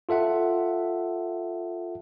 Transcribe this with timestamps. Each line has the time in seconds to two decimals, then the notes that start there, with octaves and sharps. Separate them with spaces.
0.09 F4 A4 E5 F#5